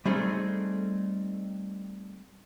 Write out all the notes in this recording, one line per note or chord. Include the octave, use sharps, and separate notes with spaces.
G3 A3 C4 D#4 G#4 A4